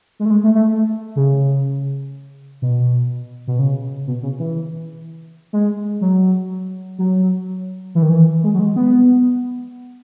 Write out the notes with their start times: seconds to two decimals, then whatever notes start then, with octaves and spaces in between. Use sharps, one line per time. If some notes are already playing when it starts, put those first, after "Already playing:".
0.20 G#3
0.25 A3
0.31 G#3
0.44 A3
0.55 A3
1.16 C#3
2.62 B2
3.47 B2
3.59 C#3
4.07 B2
4.23 C#3
4.39 E3
5.53 G#3
6.01 F#3
6.99 F#3
7.95 E3
8.02 D#3
8.10 E3
8.44 G#3
8.54 F#3
8.59 G#3
8.76 B3